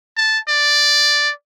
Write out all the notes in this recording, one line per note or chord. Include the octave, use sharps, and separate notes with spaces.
A5
D5